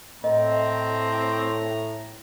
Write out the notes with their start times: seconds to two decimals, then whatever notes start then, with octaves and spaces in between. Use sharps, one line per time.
0.24 A2 C4 D#5 A#5